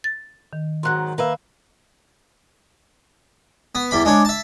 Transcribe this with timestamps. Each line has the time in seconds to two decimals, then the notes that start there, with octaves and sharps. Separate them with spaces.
0.04 A6
0.53 D#3
0.83 G#2 D#3 F#3 C6 F#6
1.18 A#3 B4 E5
3.75 B3
3.91 E2 G3 B5
4.05 G#3 D4 C#5
4.25 E5 A5